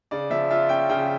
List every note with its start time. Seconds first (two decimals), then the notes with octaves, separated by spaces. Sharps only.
0.11 C#3 D5
0.30 F3 E5
0.50 F4 E5
0.69 C#4 G5
0.89 C#3 G5